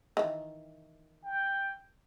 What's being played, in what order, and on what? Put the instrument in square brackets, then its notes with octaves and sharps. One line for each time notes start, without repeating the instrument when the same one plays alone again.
[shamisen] D#3 E3
[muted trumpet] G5